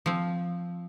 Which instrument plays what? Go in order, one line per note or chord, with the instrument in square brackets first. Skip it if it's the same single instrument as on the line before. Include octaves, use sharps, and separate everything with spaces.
[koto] F3 C4